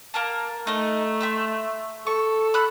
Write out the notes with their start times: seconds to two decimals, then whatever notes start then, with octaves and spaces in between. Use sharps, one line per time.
0.14 A#3 A#4 A5
0.67 A3 D#4 D#5
1.21 E5 C6 E6
2.07 A4 C#6
2.54 B5 E6 F#6